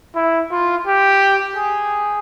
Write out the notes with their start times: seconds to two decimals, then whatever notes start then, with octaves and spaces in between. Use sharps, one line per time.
0.15 E4
0.51 F4
0.87 G4
1.56 G#4